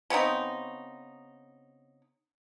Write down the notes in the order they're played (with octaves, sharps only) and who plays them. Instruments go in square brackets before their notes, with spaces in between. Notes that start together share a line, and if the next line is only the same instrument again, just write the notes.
[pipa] C#3 B3 C4 D#4